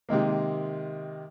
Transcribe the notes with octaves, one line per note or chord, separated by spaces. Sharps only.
C3 D#3 G#3 A#3